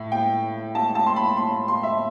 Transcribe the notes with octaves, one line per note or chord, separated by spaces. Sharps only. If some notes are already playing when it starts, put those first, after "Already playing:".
Already playing: A2
G5
A5
A5
C6
B5
C6
C6
E5